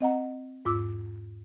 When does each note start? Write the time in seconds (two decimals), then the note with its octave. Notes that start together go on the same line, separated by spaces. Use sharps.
0.01 C4 D#5 F#5 A#5
0.65 E2 G#2 F4 D6 E6